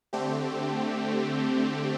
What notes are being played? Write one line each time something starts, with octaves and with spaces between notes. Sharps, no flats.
D3 A3 C4 G4